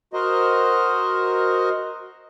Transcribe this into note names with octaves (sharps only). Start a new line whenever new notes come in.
F#4 A#4 C5 D#5